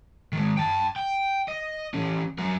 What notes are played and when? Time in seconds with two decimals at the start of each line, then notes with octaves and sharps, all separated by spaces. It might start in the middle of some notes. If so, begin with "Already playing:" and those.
0.33 D#3 G#3
0.57 G5 A5
0.96 G5
1.48 D#5
1.94 E3 C#4
2.38 F#3 A#4